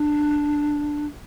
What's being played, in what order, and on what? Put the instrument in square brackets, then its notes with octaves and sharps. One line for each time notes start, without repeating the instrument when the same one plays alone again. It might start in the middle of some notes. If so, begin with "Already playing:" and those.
Already playing: [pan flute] D4